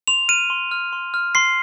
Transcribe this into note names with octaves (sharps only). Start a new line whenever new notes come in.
C6 F7
F6 D#7
C6
F6
C6
F6
C6 C7